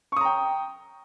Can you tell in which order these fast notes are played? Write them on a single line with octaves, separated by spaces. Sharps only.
C#6 D#6 A#5 G5